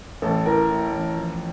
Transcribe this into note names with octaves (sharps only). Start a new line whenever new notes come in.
A1 A4
E3 A#4
A2
A1
F3